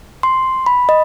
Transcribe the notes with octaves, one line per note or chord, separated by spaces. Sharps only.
C6
B5
D#5